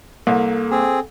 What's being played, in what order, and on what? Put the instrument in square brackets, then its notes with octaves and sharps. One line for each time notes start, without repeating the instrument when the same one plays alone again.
[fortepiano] C2 [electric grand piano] A#3 [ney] A4
[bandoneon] C4 G#4